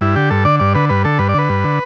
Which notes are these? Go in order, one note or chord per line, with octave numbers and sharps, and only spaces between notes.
G2 E4
D3 G4
G2 A4
D3 D5
G2 D5
D3 B4
G2 B4
D3 A4
G2 B4
D5
D3 B4
G2
D3